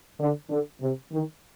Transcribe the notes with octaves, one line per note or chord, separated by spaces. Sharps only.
D3
D3
C3
D#3